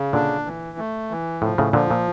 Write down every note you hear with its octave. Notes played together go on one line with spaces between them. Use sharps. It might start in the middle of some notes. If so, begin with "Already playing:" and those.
Already playing: C#3
A#2 D3 D4
E3
A3
E3
A2 F3
A2 C#3
A#2 D3 F3
A#2